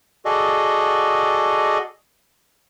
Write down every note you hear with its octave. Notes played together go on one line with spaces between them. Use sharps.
F#4 G#4 A4 D5 D#5